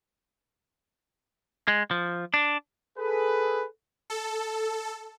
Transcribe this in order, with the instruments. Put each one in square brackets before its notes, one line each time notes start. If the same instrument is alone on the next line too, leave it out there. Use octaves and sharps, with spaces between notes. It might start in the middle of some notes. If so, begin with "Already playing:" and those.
[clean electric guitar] G#3
F3
D4
[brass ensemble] G#4 A4 B4
[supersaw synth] A4